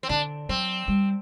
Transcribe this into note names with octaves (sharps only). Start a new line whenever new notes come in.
C4
D3 D4
F#3 C4
G3